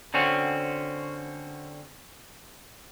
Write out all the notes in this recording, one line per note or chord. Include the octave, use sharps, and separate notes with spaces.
D3 C4 C#4 F#4